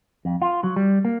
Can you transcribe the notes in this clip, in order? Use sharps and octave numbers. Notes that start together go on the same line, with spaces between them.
F2
F4
F#3
G3
A#3